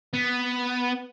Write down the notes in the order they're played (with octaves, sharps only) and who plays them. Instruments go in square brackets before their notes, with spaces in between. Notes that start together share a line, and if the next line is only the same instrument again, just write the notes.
[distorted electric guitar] B3